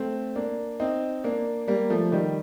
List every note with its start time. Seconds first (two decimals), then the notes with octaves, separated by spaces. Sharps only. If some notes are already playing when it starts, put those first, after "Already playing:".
Already playing: A3 C4
0.36 A#3 D4
0.80 C4 D#4
1.24 A#3 D4
1.68 G3 A#3
1.90 F3 A3
2.12 D#3 G3